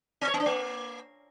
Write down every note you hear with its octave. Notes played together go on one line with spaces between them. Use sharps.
C4
C#5
B3
D4
A#3